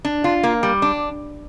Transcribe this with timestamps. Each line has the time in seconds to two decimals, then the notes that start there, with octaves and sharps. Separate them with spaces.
0.05 D4
0.24 F4
0.43 A#3
0.63 G3
0.82 D4